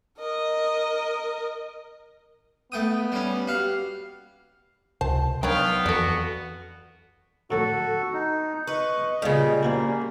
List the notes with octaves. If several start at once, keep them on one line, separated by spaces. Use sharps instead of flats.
A#4 D#5
A3 B3 G5 D#6
G3 C#4
F#4 G4 F5
C#2 C3 C5 A5
D#3 F#3 B3 D4 C#5 F5 G5
F2 E3 F#4 A4 D5
A2 D3 F#3 F#4 A4
D#4
B4 D#5 C#6
C#2 A#2 C#3 G3 F5
A#3 E4 F#4 C5